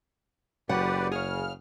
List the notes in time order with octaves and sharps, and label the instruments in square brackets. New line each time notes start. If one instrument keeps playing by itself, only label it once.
[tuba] F#1 [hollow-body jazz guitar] F#3 [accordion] G4 B4 D5 [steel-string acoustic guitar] F#5
[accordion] C#3 F6 [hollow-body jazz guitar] G#4 C#5